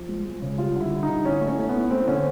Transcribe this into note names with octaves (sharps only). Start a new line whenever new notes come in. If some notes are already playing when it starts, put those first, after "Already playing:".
Already playing: F3
G#3
G#3
C#3
G3 F4
D3 E4
G3
D#4
D3
A2 C#4
A3
C#4
A3
B3
A2
A3 C4
D3 C#4